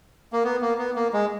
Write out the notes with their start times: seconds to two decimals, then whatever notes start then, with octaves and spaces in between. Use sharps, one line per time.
0.33 A#3
0.44 B3
0.61 A#3
0.78 B3
0.96 A#3
1.13 G#3